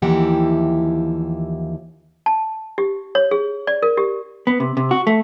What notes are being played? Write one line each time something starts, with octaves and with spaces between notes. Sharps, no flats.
D#2 E3 F3 E4 G4 F#5
A5
G4
C#5
G#4
D5
A#4
G4
B3
C3
C3
F#4
A3